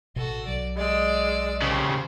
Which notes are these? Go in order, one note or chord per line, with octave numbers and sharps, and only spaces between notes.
A1 B2 F#4 A4
B1 F#3 D5
G#3 D5 E6
D#2 C#3 C5